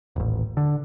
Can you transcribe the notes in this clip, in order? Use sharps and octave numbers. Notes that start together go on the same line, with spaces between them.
D#1 A1
D3